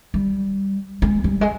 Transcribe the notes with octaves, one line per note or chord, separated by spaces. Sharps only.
G3
G#3
G3
G#3